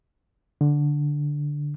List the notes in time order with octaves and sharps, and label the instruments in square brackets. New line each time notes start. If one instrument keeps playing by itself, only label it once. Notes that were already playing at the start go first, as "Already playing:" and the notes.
[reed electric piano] D3